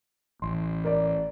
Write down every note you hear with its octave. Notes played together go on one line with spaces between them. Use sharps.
A1 C6
A#4 D5